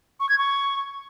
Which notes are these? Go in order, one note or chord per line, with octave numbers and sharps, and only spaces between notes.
C#6
G#6
C#6